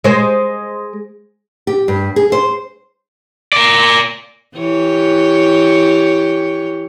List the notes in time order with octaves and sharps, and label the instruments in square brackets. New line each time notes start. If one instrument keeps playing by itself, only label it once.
[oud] G#3 C5
[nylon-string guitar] G4
G2
G#4
C5
[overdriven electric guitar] A#4 D5
[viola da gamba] E3 G4 C#5